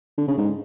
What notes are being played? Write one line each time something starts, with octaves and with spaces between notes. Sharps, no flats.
D3
C#3
G#2